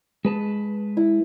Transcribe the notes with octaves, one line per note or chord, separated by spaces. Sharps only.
G#3 B4 A5
E4